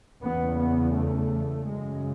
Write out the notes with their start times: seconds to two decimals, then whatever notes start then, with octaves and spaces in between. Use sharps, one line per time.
0.22 E2 C#3 B3
0.59 B3
0.95 A3
1.67 F#2 C#3 G#3